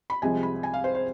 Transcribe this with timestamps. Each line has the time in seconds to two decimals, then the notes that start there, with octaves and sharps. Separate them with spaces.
0.10 B5
0.22 C2 C3 F3 G#3 G#5
0.43 B5
0.63 G#5
0.73 F5
0.84 C5
0.95 C5